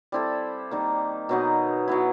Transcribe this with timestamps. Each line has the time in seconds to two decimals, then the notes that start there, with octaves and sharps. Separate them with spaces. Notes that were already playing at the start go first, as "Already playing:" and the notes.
0.12 G3 C4 E4 A4
0.71 D#3 G3 A#3
1.29 B2 F#3 B3 D#4
1.88 F#3 B3 E4